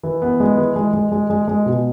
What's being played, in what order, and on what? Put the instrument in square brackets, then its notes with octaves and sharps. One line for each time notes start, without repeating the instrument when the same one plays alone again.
[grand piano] E3
B3
G#3
E3
G#3
G#3
G#3
G#3
G#3
B2